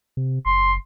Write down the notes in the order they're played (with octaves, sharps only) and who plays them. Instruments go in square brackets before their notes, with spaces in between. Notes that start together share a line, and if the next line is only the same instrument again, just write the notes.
[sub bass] C3
[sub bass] F#1 [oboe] C6